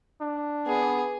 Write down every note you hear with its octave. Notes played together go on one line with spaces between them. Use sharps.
D4
B3 G#4